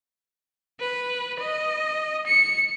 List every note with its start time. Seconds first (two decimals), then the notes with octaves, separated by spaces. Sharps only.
0.80 B4
1.40 D#5
2.27 C#7